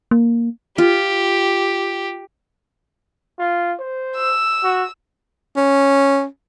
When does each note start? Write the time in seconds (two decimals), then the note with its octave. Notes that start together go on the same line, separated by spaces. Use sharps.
0.11 A#3
0.78 F4 G4
3.39 F4
3.79 C5
4.16 E6
4.63 F#4
5.56 C#4